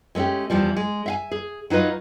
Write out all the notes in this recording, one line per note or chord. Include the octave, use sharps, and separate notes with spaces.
G#3 A3 B3 C#4 G4
E2 E3 F3 G3
G#3
E5 F5 G#5
G#4
F#3 D#4 F4 B4 D#5